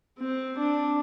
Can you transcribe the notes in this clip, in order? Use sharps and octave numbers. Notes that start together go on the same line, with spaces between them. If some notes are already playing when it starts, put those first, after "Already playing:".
C4
D4